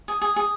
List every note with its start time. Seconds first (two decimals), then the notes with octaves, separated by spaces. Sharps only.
0.08 G#4
0.22 G#4
0.36 G#4